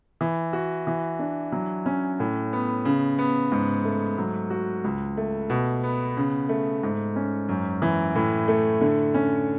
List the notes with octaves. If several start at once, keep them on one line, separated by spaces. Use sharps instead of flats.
E3
F#4
E3
D4
F#3
C#4
A2
B3
C#3
B3
G#2
A3
F#3
F#4
C#2
A3
B2
B3
C#3
A3
G#2
C#4
F#2
E3
A2
A3
D3
C#4